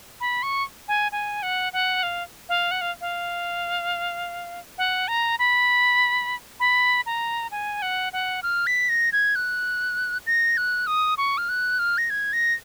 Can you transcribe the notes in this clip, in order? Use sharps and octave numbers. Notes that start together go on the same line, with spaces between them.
B5
C#6
G#5
G#5
F#5
F#5
F5
F5
F#5
F5
F5
F#5
A#5
B5
B5
A#5
G#5
F#5
F#5
F6
B6
A#6
G#6
F#6
A#6
F#6
D#6
C#6
F6
F#6
F6
A#6
G#6
A#6